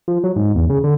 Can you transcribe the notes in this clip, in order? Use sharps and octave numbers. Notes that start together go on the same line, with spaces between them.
F3
F#3
G#2
E2
C#3
D3